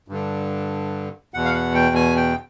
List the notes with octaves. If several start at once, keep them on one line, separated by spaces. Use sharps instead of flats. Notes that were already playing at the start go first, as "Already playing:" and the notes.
G2 D3
E2 B2 F#5
F5
F#5
G5
G#5
G5